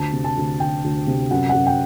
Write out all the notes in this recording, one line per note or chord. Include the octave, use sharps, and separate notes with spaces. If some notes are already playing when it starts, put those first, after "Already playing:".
Already playing: D2 A5
C3
A5
D2
D2 G5
D2
C3
F#2 F#5
F#5
F#2
G5